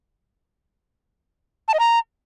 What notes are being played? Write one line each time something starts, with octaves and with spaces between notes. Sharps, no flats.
A5
D#5
A#5